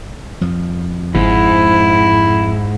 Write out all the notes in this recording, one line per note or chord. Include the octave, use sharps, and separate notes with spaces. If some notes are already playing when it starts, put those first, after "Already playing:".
F2 F3
G1 G#2 E4